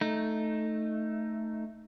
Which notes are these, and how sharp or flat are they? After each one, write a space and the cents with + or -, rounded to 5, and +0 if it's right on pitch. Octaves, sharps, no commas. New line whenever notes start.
A3 +0 D#4 +0